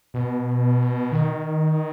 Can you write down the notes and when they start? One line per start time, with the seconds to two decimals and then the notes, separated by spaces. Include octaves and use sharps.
0.14 B2
1.12 D#3